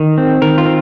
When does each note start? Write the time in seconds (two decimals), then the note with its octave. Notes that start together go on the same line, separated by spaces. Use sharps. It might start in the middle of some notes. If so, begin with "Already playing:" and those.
Already playing: D#3
0.18 C4
0.42 D#3 A#4
0.58 F4
0.66 C4